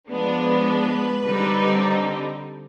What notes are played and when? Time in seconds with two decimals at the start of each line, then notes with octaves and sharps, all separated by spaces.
0.11 F3 G#3 B3 D4
0.69 B4
1.26 D3 G3 C4 D#4